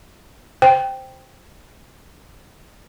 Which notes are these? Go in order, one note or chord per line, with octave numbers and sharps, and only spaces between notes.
C5 G5